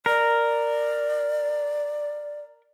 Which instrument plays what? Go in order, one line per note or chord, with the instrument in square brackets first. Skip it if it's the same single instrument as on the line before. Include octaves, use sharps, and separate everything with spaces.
[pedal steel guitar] A#4 [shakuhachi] D5